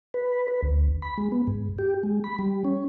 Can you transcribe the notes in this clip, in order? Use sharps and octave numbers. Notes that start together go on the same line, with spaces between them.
B4
B4
D2
B5
G#3
B3
G#2
G4
G#3
B5
G3
C#4